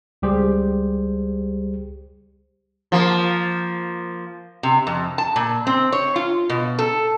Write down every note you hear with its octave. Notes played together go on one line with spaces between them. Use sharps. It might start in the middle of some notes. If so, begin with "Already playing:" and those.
C#2 G3 G4 G#4 C5
F3 A#3
C3
F2
A5
A#2
C4
C#5
F4
B2
A4